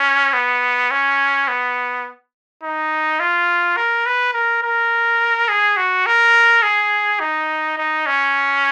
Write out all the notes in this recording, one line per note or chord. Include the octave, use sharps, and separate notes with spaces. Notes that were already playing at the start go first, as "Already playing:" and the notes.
Already playing: C#4
B3
C#4
B3
D#4
F4
A#4
B4
A#4
A#4
G#4
F#4
A#4
G#4
D#4
D#4
C#4